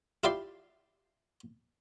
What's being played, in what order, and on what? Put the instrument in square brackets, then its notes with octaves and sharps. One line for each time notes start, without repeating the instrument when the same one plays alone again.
[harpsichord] E4 F4 G4 D5 C6